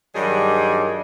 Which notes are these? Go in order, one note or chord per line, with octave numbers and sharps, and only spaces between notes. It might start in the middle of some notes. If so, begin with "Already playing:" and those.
G2 D#3 F#3 G3 G#4